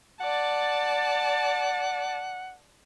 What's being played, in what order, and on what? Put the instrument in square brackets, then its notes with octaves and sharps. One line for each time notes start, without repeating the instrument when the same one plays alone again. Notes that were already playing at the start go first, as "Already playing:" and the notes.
[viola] D5 A5 [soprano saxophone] F#5